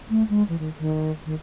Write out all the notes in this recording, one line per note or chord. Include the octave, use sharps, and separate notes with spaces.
A3
G#3
E3
D#3
D#3
D#3